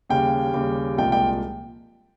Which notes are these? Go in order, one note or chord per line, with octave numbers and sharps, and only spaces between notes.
D#2 C#3 G3 G5
D#2 C#3 G3
C2 A#2 F3 G#3 G5
G5